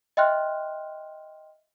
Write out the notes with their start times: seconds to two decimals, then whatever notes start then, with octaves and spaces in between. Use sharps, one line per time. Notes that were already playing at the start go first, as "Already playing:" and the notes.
0.17 D#5 E5 G5 C6 F6 F#6